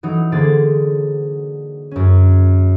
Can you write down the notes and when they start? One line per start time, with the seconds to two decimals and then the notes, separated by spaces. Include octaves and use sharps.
0.03 E3 F#3 D#4
0.32 D3 A#3 G#4 C5 D5 A6
1.91 F#2 C#4